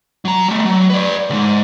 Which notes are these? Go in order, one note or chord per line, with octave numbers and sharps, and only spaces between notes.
F#3 A#5
G3 A3
F#3
B4 D5
C#2 G#2